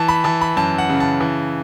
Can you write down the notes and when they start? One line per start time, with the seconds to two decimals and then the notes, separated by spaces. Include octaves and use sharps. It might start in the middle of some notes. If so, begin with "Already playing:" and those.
Already playing: E3 A5
0.08 B5
0.24 E3 A5
0.41 B5
0.57 F#2 A5
0.78 F#5
0.90 C#3
1.00 A5
1.21 E3